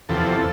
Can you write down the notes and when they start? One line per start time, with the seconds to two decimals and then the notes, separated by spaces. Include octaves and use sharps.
0.09 E2 C3 F3 A4